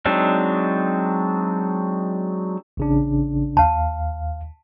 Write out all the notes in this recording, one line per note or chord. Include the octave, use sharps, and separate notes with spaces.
F#3 G#3 C4 D4 D#4
A1 C#3 D4
D#2 F5 A5